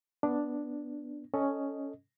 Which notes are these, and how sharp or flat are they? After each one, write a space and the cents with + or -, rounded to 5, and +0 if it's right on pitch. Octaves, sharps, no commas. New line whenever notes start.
B3 -5 D4 +0
C#4 +5 A4 +0 D#5 +0